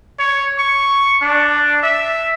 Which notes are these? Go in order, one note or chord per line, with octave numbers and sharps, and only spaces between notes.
C#5
C#6
D4
E5